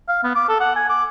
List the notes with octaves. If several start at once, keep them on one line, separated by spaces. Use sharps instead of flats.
F5
B3
D6
A4
F#5
G#5
D6